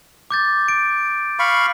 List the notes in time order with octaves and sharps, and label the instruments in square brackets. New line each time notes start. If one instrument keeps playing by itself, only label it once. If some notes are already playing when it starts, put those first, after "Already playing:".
[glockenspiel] D6 G6 A6
D7
[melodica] F5 B5 C#6